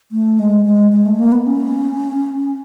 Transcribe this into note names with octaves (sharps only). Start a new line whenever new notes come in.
A3
G#3
G#3
G#3
A3
A#3
B3
C#4